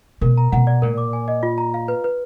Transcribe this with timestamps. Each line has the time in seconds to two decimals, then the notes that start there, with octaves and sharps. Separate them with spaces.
0.21 B2 A#4
0.37 A#5
0.52 B2 F#5
0.67 D5
0.82 A#2 A#4
0.98 D6
1.13 G#5
1.28 D#5
1.43 F4
1.58 A#5
1.74 F5
1.88 B4
2.04 B4